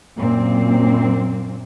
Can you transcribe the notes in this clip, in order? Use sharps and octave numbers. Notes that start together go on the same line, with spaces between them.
F#2 A#2 A#3 C4